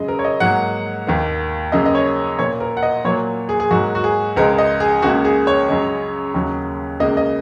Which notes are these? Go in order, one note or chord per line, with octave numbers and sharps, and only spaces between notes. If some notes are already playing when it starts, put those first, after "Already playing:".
Already playing: F#2 C#3 G#3 D#5
A#4
C#5
D#5
G#2 F#3 A#3 F#5
D#2 D#3 A#3
F#2 C#3 A#3 D#5
D#5
C#5
A#2 A#3 C#5
A#4
F#5
D#5
A#2 F#3 A#3 C#5
G#4
G#4
G#2 F#3 A#3 F#4
F#4
G#4
C#2 C#3 G#3 A#4
D#5
G#4
C#2 C#3 A#3 F#4
G#4
C#5
F#2 C#3 G#3
D#2 C#3 F#3
C#2 C#3 A#3 D#5
D#5